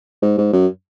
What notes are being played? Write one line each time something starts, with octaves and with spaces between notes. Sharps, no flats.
G#2
G#2
F#2